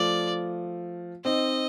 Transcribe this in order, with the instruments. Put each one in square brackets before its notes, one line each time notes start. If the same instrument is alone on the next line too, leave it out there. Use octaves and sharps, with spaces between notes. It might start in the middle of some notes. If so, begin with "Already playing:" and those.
Already playing: [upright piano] F3 A3 [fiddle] D5
[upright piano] C4 D#4 [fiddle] D#5